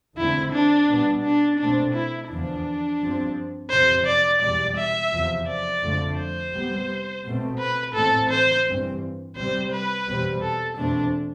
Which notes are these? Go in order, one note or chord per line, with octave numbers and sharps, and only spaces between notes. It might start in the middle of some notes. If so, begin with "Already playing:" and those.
E2 D3 A3 C4 E4
D4
B2 G3 B3
D4
B2 A3 C4 D4
E4
E2 D3 F3 D4
G2 F3 C4
F2 C3 E3 C5
D5
E2 B2 G3 D5
E5
E2 C3 F3
D5
F2 D3 F3 A3
C5
C3 G3 B3
B2 A3 C4
B4
A2 E3 A3 C4 A4
C5
G2 E3 G3 C4
C3 G3 C4 C5
B4
E2 B2 G3 C4
A4
E2 B2 A3 C4 D4